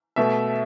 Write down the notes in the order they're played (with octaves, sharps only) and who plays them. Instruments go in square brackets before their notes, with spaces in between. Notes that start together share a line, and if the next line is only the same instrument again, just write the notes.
[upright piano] B2 A3 E5